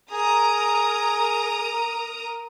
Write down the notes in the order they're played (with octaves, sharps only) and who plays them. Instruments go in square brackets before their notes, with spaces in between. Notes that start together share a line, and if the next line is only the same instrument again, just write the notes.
[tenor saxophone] G#4 [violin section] A#4 A#5 D#6